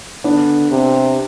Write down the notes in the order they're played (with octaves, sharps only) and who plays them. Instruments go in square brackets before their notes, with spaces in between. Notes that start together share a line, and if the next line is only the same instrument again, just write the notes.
[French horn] D3 [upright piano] B3 D4
[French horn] C3